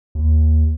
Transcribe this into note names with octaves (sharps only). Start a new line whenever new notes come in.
D#2